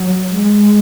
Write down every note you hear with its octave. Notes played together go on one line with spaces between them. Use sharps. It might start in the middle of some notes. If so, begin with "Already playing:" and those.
Already playing: F#3
G#3